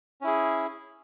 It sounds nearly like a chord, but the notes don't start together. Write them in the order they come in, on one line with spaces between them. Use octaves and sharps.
C#4 E4 G#4